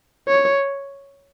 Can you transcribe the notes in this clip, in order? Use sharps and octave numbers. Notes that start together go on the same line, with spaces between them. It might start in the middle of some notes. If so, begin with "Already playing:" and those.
C#5